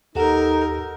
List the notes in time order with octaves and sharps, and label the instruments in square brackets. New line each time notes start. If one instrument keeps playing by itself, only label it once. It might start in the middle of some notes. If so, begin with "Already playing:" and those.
[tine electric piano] D#2 G4 F#5 [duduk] D#4 [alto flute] A4 [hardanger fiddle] A#4